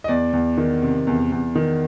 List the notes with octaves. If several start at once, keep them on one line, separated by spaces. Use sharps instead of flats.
D#5
E2 D5
E2
D#3
C3
E2
E2
D#3